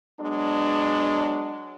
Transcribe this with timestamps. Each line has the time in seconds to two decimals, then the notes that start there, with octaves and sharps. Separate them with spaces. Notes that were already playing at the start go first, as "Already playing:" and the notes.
0.20 F#3 G#3 B3 D4